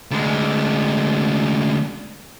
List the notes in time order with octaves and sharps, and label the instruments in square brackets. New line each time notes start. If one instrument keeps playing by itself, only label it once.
[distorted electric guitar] D2 G#3